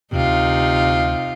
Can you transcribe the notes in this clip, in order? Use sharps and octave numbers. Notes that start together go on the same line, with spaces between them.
D2 C3 D#4 F4